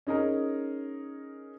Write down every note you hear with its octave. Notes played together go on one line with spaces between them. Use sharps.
C#4 D#4 G#4 A#4